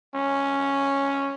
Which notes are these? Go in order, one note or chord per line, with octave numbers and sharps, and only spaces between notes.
C#4